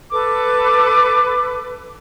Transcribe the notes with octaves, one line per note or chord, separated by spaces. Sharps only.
A4 B4 D6